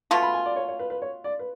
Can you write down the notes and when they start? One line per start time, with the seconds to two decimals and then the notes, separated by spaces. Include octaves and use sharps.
0.11 B2 A3 F4 C#6
0.23 B5
0.34 G#5
0.46 D5
0.56 C#5
0.68 C#5
0.79 B4
0.90 B4
1.02 C#5
1.24 D5
1.39 B4